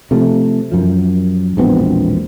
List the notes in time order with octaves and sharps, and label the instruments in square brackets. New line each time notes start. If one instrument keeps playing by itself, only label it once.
[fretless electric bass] C3 F3 A3
F#2 F3
E1 A#1 B3 C4